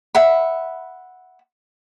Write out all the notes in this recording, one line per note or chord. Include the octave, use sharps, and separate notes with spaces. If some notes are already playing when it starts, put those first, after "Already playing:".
E5 F#5 B5